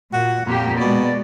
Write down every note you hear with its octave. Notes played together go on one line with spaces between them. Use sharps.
A#2 F#4
F2 A#2 A#3 G4
B2 G#3 D5